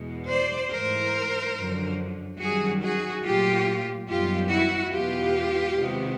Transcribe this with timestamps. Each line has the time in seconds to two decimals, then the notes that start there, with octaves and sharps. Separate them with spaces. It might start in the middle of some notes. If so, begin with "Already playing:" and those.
Already playing: E2 B2 G#3
0.29 C5 D5
0.71 G#2 E3 A3 A#4 C5
1.56 F#2 D3 F3
2.40 F#2 D#3 G3 F#4 G#4
2.82 F#4 G#4
3.24 A#2 F#3 A3 F4 G4
4.09 F#2 D#3 G3 B3 F4 G4
4.51 E4 F#4
4.93 E2 B2 G#3 B3 F4 G4
5.78 C3 D#3 G#3 B3